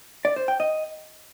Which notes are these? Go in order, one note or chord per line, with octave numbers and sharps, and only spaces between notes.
D5
C5
G5
D#5